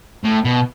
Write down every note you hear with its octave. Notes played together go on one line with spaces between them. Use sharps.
A2
B2